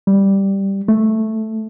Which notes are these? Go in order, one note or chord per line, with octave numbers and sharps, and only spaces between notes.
G3
A3